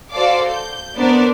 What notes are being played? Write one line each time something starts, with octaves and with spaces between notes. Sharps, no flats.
F#4 A4 C5 D5 F5 D6
G6
B3 D4 A#4 C5 D5